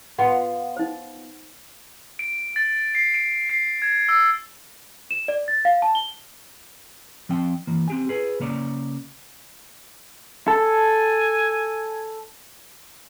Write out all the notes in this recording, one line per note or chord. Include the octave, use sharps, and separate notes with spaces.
B3 F4 F#5
D#4 C5
D7
A6
C7
D7
C7
G#6
E6
E7
D5
A6
F5
A5
G7
F3 C4 G5
E3 A#3
C4 G4 G#5
G#4 B4
C#3 A#3 C#5 D5
A4 G#5